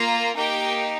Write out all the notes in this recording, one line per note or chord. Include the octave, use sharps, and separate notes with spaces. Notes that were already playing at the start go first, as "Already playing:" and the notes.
Already playing: A#3 F4 A#5
A#3 D#4 G4 G5